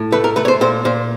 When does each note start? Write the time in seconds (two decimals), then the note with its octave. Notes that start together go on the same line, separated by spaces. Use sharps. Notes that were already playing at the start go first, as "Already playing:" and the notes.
Already playing: A2
0.12 A3 B4
0.24 A#4
0.36 A3 B4
0.45 C#5
0.48 C5
0.61 A#2 C5
0.85 A#2 C5